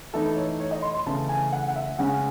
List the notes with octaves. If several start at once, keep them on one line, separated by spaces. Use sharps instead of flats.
E3 A3 D#4 A4
C#5
C#5
D#5
C6
C6
C#3 E3 A3 A5
G#5
F#5
F#5
E5
C#3 G#3 C#4 F#5